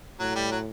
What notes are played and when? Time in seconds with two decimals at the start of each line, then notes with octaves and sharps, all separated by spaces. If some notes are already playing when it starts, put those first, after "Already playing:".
0.19 A2 F#3
0.35 G3
0.51 F#3